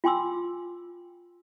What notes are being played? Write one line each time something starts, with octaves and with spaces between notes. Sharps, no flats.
F4 G5 G#5 C6 D6 E6